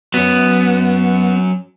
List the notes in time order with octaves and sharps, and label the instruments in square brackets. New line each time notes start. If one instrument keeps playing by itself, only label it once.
[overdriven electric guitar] F#3 C#4 [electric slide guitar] B3